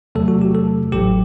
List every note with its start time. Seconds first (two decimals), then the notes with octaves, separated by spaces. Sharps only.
0.15 E2 C3 F#3 A3 A4
0.28 F#4
0.41 G4
0.55 A4
0.92 A1 A2 F#3 G4